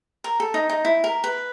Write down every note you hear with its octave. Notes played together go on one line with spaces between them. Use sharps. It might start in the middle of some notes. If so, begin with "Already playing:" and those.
A#4
A4
D#4
D#4
E4
A#4
B4